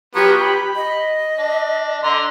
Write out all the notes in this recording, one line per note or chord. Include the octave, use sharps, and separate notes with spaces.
F3 F#3 B3 G4
B5
D#5
D4
D3 A#5 C6